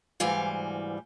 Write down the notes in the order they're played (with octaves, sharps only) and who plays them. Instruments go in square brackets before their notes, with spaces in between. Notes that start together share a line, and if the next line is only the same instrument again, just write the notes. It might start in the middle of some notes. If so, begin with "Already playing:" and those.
[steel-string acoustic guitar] D2 G#2 E3 G3 F5